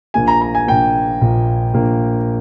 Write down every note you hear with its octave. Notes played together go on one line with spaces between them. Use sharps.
A#1 A#2 A#3 G#5
A#5
A#5
G#5
A#1 A#2 A#3 G5
A#1 A#2 A#3
A#1 A#2 A#3